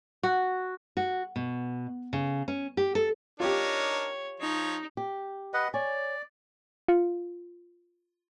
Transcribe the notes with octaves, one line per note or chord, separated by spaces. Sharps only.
F#4
F#4
B2
C#3
C#4
G4
A4
D4 D#4 F4 G4 A#4 C#5
F3 D#4 C#5
G4
B4 D#5 F#5
C#5 D5 G#5
F4